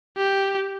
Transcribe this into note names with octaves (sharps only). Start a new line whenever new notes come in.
G4